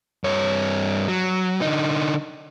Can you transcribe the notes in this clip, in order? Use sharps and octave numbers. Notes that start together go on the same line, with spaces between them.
G2 C#5
F#3
D3 D#4